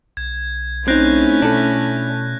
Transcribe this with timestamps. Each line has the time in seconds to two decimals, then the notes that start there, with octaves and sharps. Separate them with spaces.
0.17 B1 G#6
0.88 A3 C4 C#4 D#4 E4 F#6 G6 A#6
1.42 B2 D4 A4